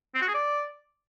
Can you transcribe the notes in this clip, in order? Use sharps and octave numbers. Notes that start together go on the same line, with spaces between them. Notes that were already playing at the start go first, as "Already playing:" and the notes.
C4
F#4
G#4
D5